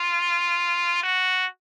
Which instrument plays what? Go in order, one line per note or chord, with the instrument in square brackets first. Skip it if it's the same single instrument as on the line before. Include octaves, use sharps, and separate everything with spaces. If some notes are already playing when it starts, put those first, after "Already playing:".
Already playing: [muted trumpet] F4
F#4